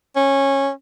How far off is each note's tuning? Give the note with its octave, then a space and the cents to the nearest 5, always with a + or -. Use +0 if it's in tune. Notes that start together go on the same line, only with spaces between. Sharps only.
C#4 -15